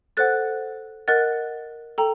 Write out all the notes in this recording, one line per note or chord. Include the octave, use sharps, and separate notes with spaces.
A4 C5 F#5 F#6 A6
A#4 D#5 F#5 F#6 A6
A4 G5 A#5